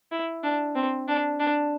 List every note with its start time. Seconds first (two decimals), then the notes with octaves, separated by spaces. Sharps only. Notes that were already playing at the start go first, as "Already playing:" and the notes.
0.12 E4
0.43 D4
0.75 C4
1.08 D4
1.39 D4